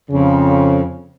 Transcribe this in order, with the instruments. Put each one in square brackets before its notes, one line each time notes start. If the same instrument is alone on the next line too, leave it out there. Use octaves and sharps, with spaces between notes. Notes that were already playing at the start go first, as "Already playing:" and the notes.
[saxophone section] F2 [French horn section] C#3